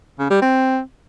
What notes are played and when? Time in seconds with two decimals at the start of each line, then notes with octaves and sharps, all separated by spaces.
0.19 C#3
0.30 G3
0.42 C4